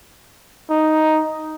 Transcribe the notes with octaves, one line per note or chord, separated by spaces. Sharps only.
D#4